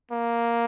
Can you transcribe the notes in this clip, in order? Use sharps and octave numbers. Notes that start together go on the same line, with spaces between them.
A#3